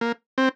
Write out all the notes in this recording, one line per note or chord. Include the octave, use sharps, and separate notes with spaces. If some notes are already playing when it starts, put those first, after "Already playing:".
A#3
C4